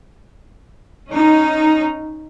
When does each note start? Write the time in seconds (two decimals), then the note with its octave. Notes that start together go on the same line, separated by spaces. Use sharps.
1.11 C#4 D#4